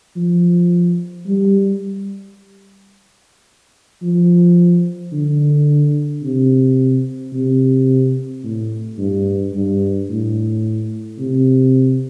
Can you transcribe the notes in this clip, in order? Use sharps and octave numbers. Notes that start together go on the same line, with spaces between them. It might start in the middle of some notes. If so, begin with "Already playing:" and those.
F3
G3
F3
D3
C3
C3
A2
G2
G2
A2
C3